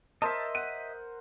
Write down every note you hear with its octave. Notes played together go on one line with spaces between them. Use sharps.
A#4 C5 D#5 E5 A5
F#5 D#7